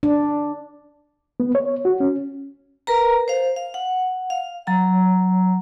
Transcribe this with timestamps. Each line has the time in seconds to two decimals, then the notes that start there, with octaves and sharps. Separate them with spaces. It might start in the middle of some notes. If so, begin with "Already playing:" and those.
0.03 D4
1.40 B3
1.55 C#5
1.85 F#4
2.00 C#4
2.87 A#4 B4 A#5
3.28 C5 F5
3.56 F5
3.74 F#5
4.30 F5
4.67 F#3 A#5